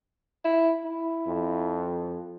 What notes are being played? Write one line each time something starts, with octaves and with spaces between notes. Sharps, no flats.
E4
E4
F2